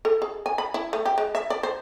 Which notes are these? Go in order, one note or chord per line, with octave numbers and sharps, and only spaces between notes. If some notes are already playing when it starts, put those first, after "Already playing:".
A4
G#4
G#5
B5
E4
A3
G4
G#3
E5
D5
C5